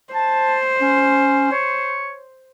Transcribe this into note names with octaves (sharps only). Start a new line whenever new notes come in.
C5 A5
C#4
C#5